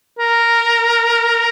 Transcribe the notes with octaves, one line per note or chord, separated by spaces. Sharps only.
A#4